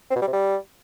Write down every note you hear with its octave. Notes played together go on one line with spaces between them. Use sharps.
C4
B2
G3
C3
G3